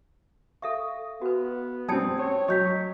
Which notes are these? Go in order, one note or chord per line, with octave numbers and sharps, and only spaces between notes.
A4 E5 F5 C#6
B3 F#4 B4
G3 C4 A5 D#6 G#6 C#7
C#4 C#5
F#3 D#5 C#6 G6 B6